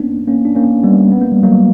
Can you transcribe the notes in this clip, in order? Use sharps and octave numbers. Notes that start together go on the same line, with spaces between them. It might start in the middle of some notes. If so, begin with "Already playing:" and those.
Already playing: A#3 B3 C#4 D4
A#3 C#4
D4
A#3 C#4
G3 B3
B3
A#3
G3
F#3 A#3